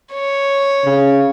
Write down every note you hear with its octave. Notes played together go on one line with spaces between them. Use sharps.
C#5
C#3